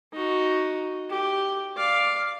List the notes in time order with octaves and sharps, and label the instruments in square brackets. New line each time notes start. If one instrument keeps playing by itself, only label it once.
[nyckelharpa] D#4 F#4
G4
D5 F5